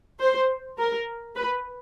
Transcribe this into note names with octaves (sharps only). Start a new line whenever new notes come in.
C5
A#4
B4